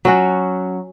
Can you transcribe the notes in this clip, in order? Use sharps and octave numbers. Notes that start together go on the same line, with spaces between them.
F#3 C#4 F#4